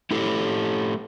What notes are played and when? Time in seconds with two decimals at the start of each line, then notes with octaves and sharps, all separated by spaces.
0.11 A3 E4 G4 A4